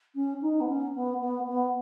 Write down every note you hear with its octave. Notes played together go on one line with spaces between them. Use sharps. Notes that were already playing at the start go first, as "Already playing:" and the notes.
C#4
D#4
B3
C#4
B3
B3
B3